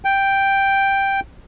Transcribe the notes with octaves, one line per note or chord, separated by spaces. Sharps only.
G5